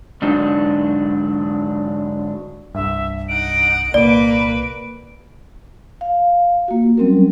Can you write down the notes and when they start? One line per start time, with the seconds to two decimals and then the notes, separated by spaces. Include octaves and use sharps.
0.22 G#2 D3 F#3 D4 D#4
2.75 C2 G2 E5
3.29 D#4 F#5 D7
3.94 C2 A#2 A#3 B4 D5
6.01 F5
6.68 A#3 F4 F#4
6.97 F#3 G3 C4 C#4 A#4